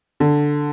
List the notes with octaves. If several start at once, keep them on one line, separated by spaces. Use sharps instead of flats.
D3